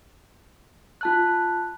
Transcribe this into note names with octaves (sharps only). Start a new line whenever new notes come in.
F4 A5 F#6